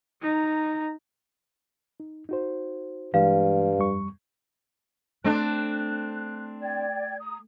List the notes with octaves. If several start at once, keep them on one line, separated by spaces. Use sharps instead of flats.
D#4 A#5
D#4
D#4 F#4 C5
G2 E3 G#3 F5
F2 G3 C#6
A3 C4 D4 F#6
D5 G5 G#6
A#5 D#6